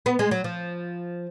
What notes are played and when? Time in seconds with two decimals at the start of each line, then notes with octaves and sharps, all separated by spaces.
0.06 B3
0.19 G#3
0.31 F#3
0.44 F3